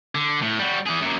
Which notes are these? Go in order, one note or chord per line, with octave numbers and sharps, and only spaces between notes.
D3
A2
G3 F#4
E3 G#4
F#2 A#2